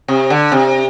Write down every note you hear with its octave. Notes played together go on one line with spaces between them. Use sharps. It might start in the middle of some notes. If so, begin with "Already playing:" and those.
C3
D3
C3